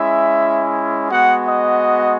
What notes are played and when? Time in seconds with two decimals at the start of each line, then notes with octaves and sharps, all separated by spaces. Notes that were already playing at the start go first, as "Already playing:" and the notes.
Already playing: G#3 C#4 E4 E5
1.10 G#3 B3 F#4 F#5
1.47 D#5